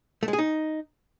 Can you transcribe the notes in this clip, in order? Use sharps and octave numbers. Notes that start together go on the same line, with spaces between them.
A3
G#3
G#4
D#4